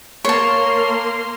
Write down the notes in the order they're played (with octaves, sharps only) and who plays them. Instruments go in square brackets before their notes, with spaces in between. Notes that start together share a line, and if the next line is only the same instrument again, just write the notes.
[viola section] A#3 A#4 C6 [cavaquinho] C#5 A5